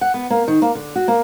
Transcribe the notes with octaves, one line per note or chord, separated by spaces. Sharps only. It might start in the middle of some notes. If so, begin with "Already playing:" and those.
F#5
B3
A#3
D#3
A#3
D3
F#4
A#3